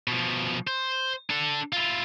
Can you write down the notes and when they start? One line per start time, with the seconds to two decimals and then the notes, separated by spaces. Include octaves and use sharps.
0.08 B2 F3
0.67 C5
1.30 D4 A4
1.72 E4 F4